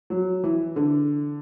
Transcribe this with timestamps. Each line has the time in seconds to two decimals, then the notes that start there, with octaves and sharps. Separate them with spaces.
0.10 F#3
0.44 E3
0.76 D3